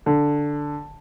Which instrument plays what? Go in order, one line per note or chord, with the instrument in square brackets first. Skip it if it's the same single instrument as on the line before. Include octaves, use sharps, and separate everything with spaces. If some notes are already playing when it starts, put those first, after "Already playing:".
[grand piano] D3